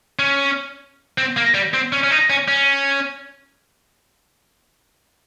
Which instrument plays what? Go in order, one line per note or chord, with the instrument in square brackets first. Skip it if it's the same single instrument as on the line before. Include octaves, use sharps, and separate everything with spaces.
[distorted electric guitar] C#4
C4
A#3
G3
C4
C#4
C#4
D#4
C#4
C#4